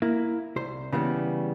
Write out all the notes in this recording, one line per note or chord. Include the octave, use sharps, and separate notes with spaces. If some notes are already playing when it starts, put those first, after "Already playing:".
A#3 E4
C2 C5
C#3 E3 G3 B3